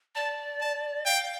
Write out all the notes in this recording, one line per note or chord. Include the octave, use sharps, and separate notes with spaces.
D5 A5
A5
F5 G5